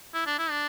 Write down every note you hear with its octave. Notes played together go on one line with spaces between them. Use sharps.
E4
D4
E4
D4